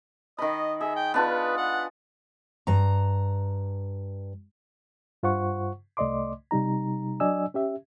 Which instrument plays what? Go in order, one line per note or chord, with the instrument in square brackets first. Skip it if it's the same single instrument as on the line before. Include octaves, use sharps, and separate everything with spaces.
[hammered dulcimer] D#3 B5 [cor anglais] D#5
[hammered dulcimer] G#4 [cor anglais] E5
[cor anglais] G5
[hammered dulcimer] B3 D4 F4 [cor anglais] B4
[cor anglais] F#5
[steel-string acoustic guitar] G2 A#5
[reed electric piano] G2 F4 C5 F#5 C#6
C2 A3 D5 D#5 C6 D6
C3 G3 D#4 A#5
F#3 D4 D5 D#5 G#5 E6
C#4 G4 E5